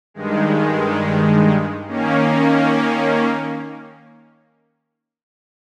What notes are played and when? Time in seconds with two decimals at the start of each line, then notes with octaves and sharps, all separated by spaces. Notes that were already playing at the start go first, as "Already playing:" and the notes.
0.14 G2 D#3 G#3
1.87 D#3 A#3 C#4